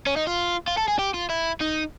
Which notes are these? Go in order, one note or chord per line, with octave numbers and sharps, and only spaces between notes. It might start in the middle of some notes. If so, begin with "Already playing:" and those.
C#4
D#4
F4
F4
A4
G#4
G4
F4
E4
D#4